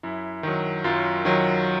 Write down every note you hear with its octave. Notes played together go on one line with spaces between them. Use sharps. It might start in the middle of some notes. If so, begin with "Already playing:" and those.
F#2 E4
D#3 F#3
F#2 F4
D#3 F#3